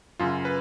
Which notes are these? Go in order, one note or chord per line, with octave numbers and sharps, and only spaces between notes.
F#2 C#3 F4
B4